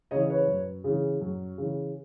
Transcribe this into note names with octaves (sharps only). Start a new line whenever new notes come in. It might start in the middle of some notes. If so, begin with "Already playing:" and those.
C#3 E3 C#5 D#5
B4 C#5
F#2
C#3 E3
F#2
C#3 E3